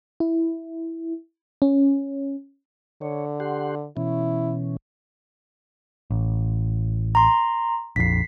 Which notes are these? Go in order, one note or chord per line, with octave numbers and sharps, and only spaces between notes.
E4
C#4
D3 C#5
G4 F#5 C6
B2 E3 C#4 E4
A1
A#5 C6
A#1 F2 B6 C7